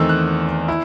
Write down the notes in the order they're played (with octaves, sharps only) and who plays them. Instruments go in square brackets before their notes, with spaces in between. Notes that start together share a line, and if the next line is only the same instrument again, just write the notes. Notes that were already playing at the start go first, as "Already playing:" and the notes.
Already playing: [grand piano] E2 D#3 A3 C4 D#4 E6
F#6
E4